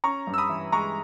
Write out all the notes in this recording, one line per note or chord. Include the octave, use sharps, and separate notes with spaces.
C#4 A#5 C#6
G2
E6
B5 D#6
E3
G#3 A#5 C#6